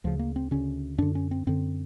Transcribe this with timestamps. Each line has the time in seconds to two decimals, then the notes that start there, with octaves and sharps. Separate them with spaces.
0.04 D2 C#3 F3
0.19 A#3
0.36 C4
0.51 D2 C#3 C#4
0.98 F#2 D3 D4
1.15 C#4
1.31 C4
1.47 F#2 D3 C4